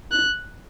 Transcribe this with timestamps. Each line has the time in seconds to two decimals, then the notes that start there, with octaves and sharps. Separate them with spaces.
0.12 F#6